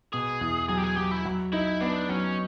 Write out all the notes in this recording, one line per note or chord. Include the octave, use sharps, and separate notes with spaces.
B2 G#4
E2
F#3 G#4
G4
G#4
F#3 G4
E4
F#3
D#4 E4
B3 D4
F#3 C#4